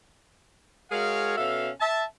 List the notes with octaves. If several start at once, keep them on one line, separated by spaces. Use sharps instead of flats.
G#3 F#4 G#4 A#4 C#5 F5
B2 C#4 A4 E5 F5
E5 A5